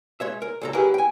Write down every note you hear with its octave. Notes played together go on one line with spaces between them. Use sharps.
G#3 C#5 E5
A#4
C#2 A4 A#5
F#3 E4 G4 G#4 A#4 B4
G5 G#5